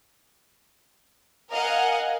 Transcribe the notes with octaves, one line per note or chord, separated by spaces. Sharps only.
A#4 D#5 F5 F#5 G#5